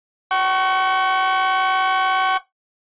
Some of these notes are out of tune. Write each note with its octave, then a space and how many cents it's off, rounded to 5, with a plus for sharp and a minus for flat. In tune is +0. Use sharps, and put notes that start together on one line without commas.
F#5 +45 C#6 +0